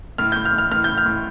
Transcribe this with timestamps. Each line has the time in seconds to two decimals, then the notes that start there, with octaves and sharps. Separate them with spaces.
0.18 A2 F6
0.32 G6
0.36 A2
0.45 F6
0.53 A2
0.58 F6
0.71 A2 F6
0.84 G6
0.88 A2
0.98 F6
1.06 A2